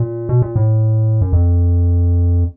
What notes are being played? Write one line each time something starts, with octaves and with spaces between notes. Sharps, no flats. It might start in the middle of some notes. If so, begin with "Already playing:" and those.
Already playing: A#2
B2
A#2
A2
F#2
F2